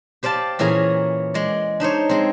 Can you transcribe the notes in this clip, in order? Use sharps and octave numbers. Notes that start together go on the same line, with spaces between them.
G4 C5 D5 F5 A5
A#2 E3 C#4 G#4 G#5 A#5
G#3 D5
D4 D#4 C5 C#5
G#3 C4